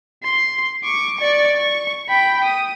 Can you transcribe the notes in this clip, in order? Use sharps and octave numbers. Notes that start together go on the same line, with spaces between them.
C6
C#6 D6
D5 C#6
C#6
G5 B5
D#6